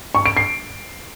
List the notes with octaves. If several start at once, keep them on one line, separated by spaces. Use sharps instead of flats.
C#6
D7
C7